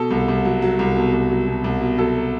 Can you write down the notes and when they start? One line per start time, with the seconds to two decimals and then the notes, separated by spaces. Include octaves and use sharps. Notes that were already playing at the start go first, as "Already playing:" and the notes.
Already playing: B2 A4
0.11 C2
0.28 C2
0.45 F#3
0.62 F#3
0.79 C2
0.96 B2
1.13 C2
1.30 F#3
1.47 B2
1.64 C2
1.81 B2
1.98 F#3 A4